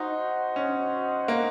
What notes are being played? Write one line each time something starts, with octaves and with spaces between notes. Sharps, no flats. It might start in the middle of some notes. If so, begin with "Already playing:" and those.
Already playing: D#4 F#4 C5 D#5 F#5
C#4
A#3